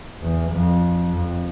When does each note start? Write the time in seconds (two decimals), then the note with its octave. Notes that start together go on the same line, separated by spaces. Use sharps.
0.22 E2
0.51 F2
1.12 F2